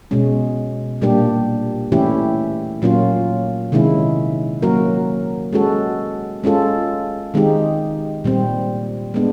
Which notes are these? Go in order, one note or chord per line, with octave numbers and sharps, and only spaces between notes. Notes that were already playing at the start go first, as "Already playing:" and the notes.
B2 G#3 C#4
A#2 G3 A#3 D4 G4
E3 A3 C#4 E4 G4
A#2 F#3 A#3 C#4 F4
C3 D#3 G#3 C#4 E4
F#3 A#3 C#4 F#4 A#4
G#3 C#4 F#4 A4
G#3 C#4 F4 A4
D#3 G#3 C4 D#4 G4
A#2 G3 C4
G#3 B3 D4